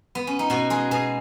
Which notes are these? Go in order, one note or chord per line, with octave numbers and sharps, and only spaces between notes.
B3
C#4
D#4
B2 F#4
G#3 G#4
B2 G#4